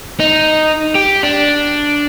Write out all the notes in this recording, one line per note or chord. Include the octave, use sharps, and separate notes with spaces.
D#4
G4
D4